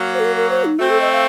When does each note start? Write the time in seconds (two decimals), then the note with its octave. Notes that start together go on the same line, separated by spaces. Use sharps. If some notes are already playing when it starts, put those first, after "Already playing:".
Already playing: F#3 A#3
0.14 C5
0.20 A4
0.25 A#4
0.36 A#4
0.50 C5
0.65 D#4
0.79 A3 C4 F#4
0.90 A4
1.01 D#5
1.12 F5